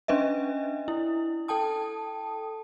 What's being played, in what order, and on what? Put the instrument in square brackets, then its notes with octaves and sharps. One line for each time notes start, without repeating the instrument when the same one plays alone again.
[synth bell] C#4 D4 B4 D#5 E5
E4
A4 G5 A5 D#6